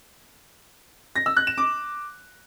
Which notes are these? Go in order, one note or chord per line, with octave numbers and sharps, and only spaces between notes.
A#6
E6
F#6
E7
D6